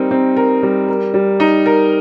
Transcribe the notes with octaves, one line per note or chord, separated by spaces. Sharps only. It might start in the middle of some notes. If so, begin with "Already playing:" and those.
Already playing: G3 C4 D#4 A#4
C4
A#4
G3
A#4
G3
D#4
A#4